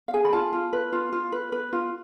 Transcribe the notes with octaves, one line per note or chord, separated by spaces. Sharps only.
F5
G#4 G#5
B5
F4 A5
F4
B4
F4
F4
B4
B4
F4